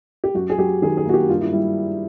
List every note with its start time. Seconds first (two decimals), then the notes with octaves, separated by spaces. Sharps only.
0.24 G4
0.34 F#2 F#4
0.50 G#4
0.59 F#3 G4
0.82 D#3 G#4
0.97 G#4
1.05 A#3 F#4
1.14 G4
1.29 G2 F4
1.40 E4
1.53 G3 E4